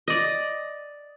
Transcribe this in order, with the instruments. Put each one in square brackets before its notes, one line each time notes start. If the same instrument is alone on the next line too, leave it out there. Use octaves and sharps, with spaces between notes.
[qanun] D5 D#5